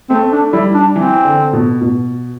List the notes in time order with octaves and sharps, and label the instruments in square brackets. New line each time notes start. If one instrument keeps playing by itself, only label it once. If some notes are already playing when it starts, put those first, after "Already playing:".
[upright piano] A3 [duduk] C4
[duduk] D4
[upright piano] G3 [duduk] E4
[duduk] D4
[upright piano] E3 [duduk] C4
[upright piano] D3
B2
B2